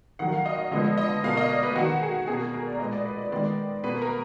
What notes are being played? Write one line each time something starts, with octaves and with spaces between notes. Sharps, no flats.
D#3 F#3 A#3 F#5
F5
D#5
D#5
D3 F3 G#3 B3 D#5
D#5
B2 A#3 F5
D#5
D5
B4
D#3 A#3 F#4
G#4
B2 A#3 G#4
A#4
A#4
D5
A#2 G#3 B3 D#5
D5
B4
D5
D#3 G#3 B3 D5
B2 A#3 B4
A#4